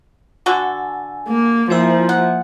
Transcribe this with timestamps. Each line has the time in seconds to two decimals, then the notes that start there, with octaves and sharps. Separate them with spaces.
0.46 D3 F#4 A4 G#5
1.27 A#3
1.70 F3 A#3 E4 C5 E5 G#5 A#5
2.09 F#5